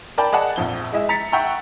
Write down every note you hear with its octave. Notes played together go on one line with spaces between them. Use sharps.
A#4 D5 G5 A5 B5
G#4 D5 D#5 F#5 A5
A#1 F2 G7
G#3 E4 D#5 E5
A#5 A6 B6 C#7
E5 F#5 G5 A#5 C#6 E6